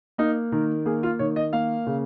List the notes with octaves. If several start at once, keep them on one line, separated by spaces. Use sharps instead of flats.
A#3 D#4
D#3 A#4
A#3 G#4
F4
D#3 C#5
D#5
A#3 F5
C#3